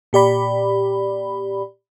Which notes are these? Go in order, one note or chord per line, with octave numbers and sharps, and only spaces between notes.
A#2 G4 D5 B5